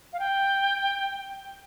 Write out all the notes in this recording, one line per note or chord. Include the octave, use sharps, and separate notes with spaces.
F5
G5